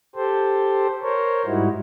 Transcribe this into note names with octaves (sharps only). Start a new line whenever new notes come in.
G4 A4 C5
A#4 C5 C#5
G#2 G3 D#4 E4 F#4